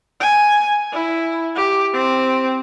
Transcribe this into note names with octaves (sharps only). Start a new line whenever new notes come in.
G#5
E4
G4
C4